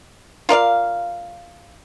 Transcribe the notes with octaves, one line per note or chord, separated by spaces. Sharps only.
F4 A#4 D5 F5